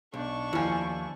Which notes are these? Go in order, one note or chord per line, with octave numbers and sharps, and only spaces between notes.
B1 D4 C#6
D#2 F3 E4 G#5